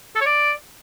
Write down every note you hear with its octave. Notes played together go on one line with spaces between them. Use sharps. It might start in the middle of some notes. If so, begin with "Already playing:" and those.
A4
C#5
D5